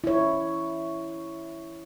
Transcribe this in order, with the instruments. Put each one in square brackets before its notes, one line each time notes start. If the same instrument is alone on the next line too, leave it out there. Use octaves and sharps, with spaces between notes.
[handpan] E4 C#5